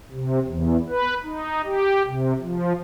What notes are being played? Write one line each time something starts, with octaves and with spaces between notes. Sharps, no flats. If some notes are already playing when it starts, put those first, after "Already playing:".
C3
E2
B4
D#4
G4
C3
F3